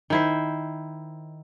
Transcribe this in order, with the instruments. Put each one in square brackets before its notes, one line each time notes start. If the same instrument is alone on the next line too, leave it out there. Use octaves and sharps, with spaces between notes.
[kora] D#3 E4 C5